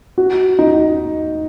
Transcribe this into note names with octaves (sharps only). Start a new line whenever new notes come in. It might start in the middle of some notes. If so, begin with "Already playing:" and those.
F#4
D#4